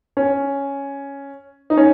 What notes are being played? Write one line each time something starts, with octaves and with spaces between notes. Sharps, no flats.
C#4
D#4
C#4